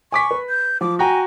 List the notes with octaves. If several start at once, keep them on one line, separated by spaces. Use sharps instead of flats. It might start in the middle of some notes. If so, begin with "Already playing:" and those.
G#5 C#6 D6 B6
B4
G6
F3 D6
F#4 G5 G#5 A#5